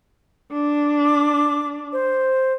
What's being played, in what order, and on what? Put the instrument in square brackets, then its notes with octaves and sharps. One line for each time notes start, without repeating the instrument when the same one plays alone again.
[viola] D4
[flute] D6
C5